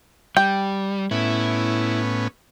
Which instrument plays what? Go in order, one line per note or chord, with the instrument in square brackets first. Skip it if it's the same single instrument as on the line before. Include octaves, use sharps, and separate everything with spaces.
[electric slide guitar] G3 [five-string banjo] G5
[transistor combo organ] A2 B3 C#4 [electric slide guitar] E4